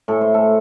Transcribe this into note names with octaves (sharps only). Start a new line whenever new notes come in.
A2 A4
C5
A4